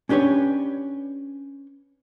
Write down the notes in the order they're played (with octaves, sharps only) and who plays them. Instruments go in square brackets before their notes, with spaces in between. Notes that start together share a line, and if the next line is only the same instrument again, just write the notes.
[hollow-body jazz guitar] C#4 D4 G4 B4 C#5